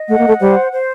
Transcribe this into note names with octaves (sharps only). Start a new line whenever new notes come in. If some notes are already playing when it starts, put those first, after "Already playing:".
Already playing: D#5
A3 F#5
A#3
A3
G3 C5
C5